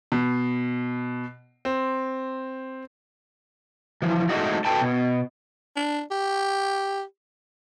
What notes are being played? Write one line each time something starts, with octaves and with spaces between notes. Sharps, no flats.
B2
C4
E3 F3
G#3 A3 D#4 F#4
F#4 A4 B4 G5 A5
B2
D4
G4